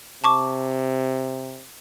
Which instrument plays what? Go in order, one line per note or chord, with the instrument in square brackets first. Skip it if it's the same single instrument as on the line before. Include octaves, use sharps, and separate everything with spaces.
[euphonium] C3 [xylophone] A5 C#6 D6